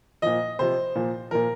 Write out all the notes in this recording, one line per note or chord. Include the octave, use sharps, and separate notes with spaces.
A#2 F3 D#5
C3 F3 C5
A#2 F3
A#2 F3 A#4